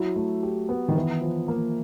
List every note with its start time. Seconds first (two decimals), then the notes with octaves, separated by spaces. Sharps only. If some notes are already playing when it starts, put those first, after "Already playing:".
Already playing: F#3 E4
0.16 A3
0.43 G4
0.69 B3
0.88 D#3
0.95 E3 B3
1.21 F3
1.48 A#3